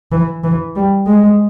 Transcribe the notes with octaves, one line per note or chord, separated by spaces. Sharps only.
E3
E3
G3
G#3